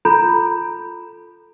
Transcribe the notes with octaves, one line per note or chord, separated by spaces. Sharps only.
F4 A4 A#5 B5 G6